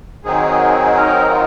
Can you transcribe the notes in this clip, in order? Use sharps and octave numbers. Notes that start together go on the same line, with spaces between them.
D#3 F#3 C4 D#4 G#4
A#4
F4